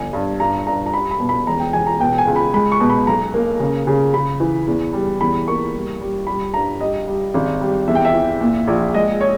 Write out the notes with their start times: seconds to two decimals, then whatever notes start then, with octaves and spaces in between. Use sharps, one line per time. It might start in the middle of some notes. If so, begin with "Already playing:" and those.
Already playing: G1 G#5
0.13 G2
0.40 G2 A#5
0.66 G2 A#5
0.86 A#5
0.94 G3 B5
1.11 B5
1.20 B2
1.29 B5
1.47 E1 A#5
1.60 G5
1.73 E1 G#5
1.87 A#5
2.00 B2 G5
2.18 G#5
2.27 C#2
2.36 B5
2.54 G#3 B5
2.72 C#6
2.80 B2
2.90 B5
3.07 B1 A#5
3.34 A#3
3.60 C#3
3.87 C#3
4.14 C#3 B5
4.40 E3
4.67 E2
4.93 G3
5.20 E2 B5
5.47 A#3 C#6
5.74 G3
6.01 G3
6.27 G3 B5
6.54 G2 A#5
6.80 G3 D#5
7.07 G3
7.34 G#1
7.61 G3
7.88 E2 E5
7.95 G5
8.05 E5
8.14 E3
8.41 A#2
8.67 A#1
8.94 G#3 D#5
9.21 C#5